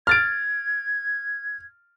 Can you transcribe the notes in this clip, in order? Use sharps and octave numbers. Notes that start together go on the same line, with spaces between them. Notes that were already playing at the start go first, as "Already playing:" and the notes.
F6 G#6 A6 D7